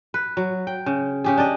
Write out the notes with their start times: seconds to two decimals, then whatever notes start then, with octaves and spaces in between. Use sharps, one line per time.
0.14 B4
0.37 F#3
0.67 G5
0.86 C#3
1.24 C#3 G4 G#4
1.38 D4 D5 D#5